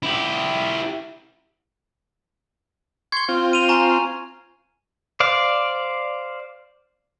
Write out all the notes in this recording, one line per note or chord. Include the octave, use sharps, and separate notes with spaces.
E4 G4
C6 C#6 G#6 G7
C4 F4
D#7 F7
G#5 A#5 C#6
C5 D5 F5